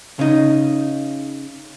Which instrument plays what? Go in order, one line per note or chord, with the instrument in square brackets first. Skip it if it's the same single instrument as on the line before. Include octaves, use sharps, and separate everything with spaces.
[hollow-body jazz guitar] C#3 D#4